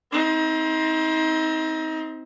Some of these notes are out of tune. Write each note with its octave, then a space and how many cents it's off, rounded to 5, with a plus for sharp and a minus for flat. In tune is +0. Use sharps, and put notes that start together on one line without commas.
C4 +0 D#4 +30